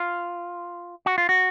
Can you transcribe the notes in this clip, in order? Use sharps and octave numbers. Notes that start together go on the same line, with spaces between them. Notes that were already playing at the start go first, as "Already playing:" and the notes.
Already playing: F4
F#4
F4
F#4